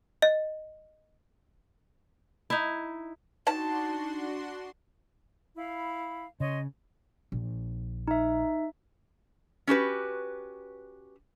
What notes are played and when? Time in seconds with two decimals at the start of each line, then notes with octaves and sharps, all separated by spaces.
0.22 D#5
2.50 D#4 E4
3.47 D4 D#4 F#4 A5 C6
5.57 E4 F5 B5
6.40 C#3 C#5 D#5 C6
7.32 A#1
8.08 D#4 E5
9.67 C#4 F#4 G4 B4